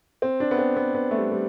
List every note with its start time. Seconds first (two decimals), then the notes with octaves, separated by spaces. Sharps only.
0.22 C4
0.40 D4
0.51 B3
0.58 C4
0.76 B3
0.94 B3
1.11 A3
1.18 G3
1.32 G3